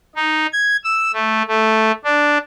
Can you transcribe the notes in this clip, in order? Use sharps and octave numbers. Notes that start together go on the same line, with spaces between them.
D#4
G#6
E6
A3
A3
D4